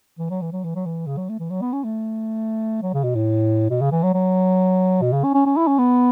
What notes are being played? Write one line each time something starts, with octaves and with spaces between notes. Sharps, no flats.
E3
F#3
E3
F#3
E3
F#3
E3
C#3
F#3
A3
E3
F#3
B3
C#4
A3
F#3
C#3
B2
A2
B2
C#3
E3
F#3
F#3
B2
C#3
C#4
C#4
C#4
E4
C#4
B3